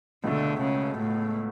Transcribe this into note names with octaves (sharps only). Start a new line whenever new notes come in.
C#2 B2 D3 A3
C#3
A2